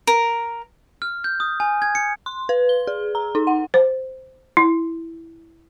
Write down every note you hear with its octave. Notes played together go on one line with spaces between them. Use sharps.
A#4
F6
G6
D#6
G#5
G#6
C#7
C6
B4
G7
G#4
A#5
D#4
F#5
C5
E4